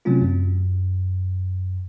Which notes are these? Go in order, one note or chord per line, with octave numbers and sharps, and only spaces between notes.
C3 F#3 A3 C4 C#4 F4
F#2